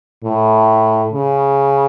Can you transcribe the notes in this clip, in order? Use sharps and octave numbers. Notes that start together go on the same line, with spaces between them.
A2
C#3